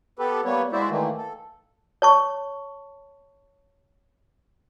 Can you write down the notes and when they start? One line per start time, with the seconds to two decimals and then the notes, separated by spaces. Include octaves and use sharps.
0.19 B3 G4 A4 B4
0.45 G3 A#3 B3 B4 C#5
0.72 G#3 E4 F#4 C5 D5 E5
0.89 D#3 E3 A3 A#3
1.17 A4
2.02 C#5 A5 C#6